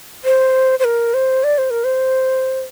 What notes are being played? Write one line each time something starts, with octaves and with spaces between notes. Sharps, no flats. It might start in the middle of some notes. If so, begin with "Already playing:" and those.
C5
C5
A#4
C5
D5
C5
A#4
C5